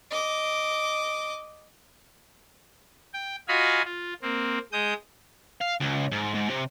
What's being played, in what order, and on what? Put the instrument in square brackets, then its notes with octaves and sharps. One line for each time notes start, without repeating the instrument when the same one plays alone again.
[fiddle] D#5 D6
[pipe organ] G5
F4 F#4 D#5 F5 G#5 B5
F4
A#3 C4
G#3 D#6 G6
[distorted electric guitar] F5
C#2
G#2
G#2
C3